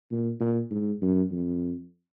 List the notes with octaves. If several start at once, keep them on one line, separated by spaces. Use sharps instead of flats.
A#2
A#2
G#2
F#2
F2